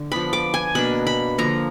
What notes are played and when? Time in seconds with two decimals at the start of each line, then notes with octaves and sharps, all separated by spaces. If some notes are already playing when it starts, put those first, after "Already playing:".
Already playing: D3
0.12 F3 B3 D4 B5
0.33 D6
0.54 G#5
0.75 B2 A#3 D4 B5
1.07 B5
1.38 D3 F3 A#3 A#5